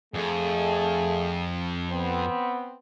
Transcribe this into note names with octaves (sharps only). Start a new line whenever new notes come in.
F2 A3 G#4
B3 C4